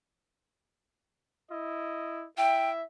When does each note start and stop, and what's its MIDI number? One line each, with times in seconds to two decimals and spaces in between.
1.50 2.26 64
1.50 2.26 75
2.37 2.83 64
2.37 2.83 76
2.37 2.70 79